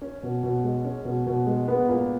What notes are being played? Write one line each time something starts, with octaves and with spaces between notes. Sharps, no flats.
C#4
B2
B2
G#3
C#4
B2
B2
G#3
B3
A#2